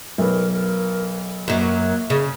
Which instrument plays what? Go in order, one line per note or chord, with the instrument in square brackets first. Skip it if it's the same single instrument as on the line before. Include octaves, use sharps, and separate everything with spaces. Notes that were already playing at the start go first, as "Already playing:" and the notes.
[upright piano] B1 B4 [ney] A#4
[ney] A#4
[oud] F#2 F#3 [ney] A#3
[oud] C#3